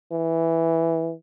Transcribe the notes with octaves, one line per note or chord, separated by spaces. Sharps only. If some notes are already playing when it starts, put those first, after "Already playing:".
E3